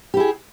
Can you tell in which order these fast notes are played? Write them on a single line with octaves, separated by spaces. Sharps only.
G4 E4 G#4